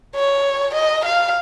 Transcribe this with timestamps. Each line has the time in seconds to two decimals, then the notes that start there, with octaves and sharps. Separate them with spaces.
0.15 C#5
0.75 D#5
1.05 F5